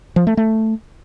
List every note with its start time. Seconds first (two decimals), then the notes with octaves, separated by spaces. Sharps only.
0.16 F3
0.27 A3
0.37 A3